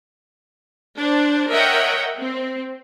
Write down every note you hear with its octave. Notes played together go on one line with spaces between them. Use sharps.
D4 C5
A#4 C#5 D#5 E5 F#5 G5
C4